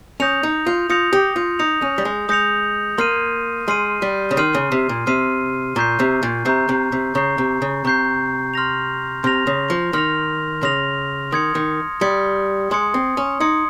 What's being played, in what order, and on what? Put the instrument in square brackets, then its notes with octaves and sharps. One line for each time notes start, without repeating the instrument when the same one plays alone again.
[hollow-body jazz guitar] C#4 [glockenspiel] D#6 G6 A#6 C#7 F7
[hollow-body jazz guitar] D#4
F4
[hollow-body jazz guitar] F4 [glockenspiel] D#6 G6 A#6 C#7 F7
[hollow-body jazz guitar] G4
F4
[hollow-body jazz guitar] D#4 [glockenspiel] D#6 G6 A#6 C#7 F7
[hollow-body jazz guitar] C#4
G3
G#3
[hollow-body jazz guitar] G#3 [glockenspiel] D#6 G6 A#6 C#7 F7
[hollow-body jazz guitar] A#3 [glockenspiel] C6 F6 C7 D#7
[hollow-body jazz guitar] G#3 [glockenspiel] C6 F6 C7 D#7
[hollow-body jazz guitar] G3
C#3
[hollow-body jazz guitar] D#3 [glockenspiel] C6 F6 C7 D#7
[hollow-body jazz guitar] C#3
C3
A#2
[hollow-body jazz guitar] C3 [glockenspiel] C6 F6 C7 D#7
[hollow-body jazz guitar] A#2 [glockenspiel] A#5 C#6 G6 C7
[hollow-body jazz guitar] C3
A#2
[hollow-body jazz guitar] C3 [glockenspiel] A#5 C#6 G6 C7
[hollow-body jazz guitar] C3
C3
[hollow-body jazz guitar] C#3 [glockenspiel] A#5 C#6 G6 C7
[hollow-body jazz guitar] C3
C#3
[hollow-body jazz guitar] C3 [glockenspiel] A#5 C#6 G6 C7
[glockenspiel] C6 F6 A#6 F7
[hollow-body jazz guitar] C3 [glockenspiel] C6 F6 A#6 F7
[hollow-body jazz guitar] C#3
F3
[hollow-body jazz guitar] D#3 [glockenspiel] C6 F6 A#6 F7
[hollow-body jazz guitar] C#3 [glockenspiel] C6 F6 A#6 F7
[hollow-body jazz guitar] D#3 [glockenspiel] C6 D#6 G#6 C#7
[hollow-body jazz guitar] D#3
[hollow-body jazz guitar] G3 [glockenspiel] C6 D#6 G#6 C#7
[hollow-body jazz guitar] G#3 [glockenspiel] C6 D#6 G#6 C#7
[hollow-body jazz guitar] C4
C#4
[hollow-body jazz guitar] D#4 [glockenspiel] C6 D#6 G#6 C#7